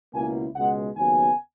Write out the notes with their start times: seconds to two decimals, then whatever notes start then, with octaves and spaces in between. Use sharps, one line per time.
0.14 C#2 B2 A#3 E4 G#5
0.55 C#2 B2 G#3 F#5
0.97 D#2 C#3 F#3 B3 G#5